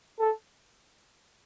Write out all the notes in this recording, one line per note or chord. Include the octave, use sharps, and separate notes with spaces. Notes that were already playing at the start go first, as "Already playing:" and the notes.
A4